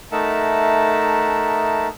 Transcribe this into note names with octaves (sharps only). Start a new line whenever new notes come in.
A3 D#4 A#4 E5 F#5 A5